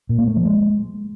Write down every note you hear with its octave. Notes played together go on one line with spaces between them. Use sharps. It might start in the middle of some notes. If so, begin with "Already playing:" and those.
A#2
A#3
A3
F3
G#3